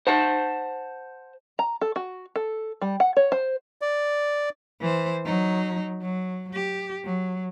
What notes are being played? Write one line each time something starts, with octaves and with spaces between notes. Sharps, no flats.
C5 F#5 A5
A#5
A4
F#4
A4
G3
F#5
C#5
C5
D5
E3 C5
F#3 D#4
F#3
G4
F#3